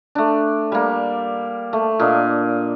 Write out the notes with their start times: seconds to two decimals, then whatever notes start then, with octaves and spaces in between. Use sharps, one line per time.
0.15 A3 D4
0.72 G3 A#3
1.73 A3
1.99 A#2 A#3 D4 D#5